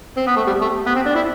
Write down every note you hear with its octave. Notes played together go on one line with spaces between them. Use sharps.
C4
B3
A3
G3
A3
B3
C4
D4
E4